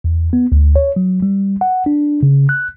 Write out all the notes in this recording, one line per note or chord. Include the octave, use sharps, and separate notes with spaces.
E2
B3
D2
C#5
F#3
G3
F#5
D4
C#3
F#6